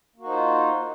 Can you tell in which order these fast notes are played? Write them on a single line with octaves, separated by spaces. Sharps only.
A#3 F#4 D#4 C5 F4